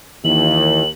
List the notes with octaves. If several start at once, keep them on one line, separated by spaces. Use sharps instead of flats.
D#2 D#3 E3 E4 F#7